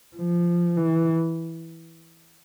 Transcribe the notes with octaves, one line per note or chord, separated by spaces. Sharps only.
F3
E3